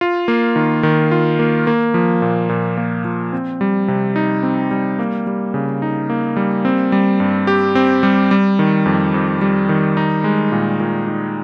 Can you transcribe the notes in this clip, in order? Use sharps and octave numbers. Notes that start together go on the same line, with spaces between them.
F4
A#3
D#3
D#3
F4
A#3
A#3
F3
A#2
A#2
A#3
F3
C4
G3
C3
D#4
C4
G3
A#3
G3
C#3
D#4
A#3
G3
C4
G3
G2
G4
C4
G3
G3
D#3
F2
F2
G3
D#3
D#4
G#3
A#2
A#2
D#4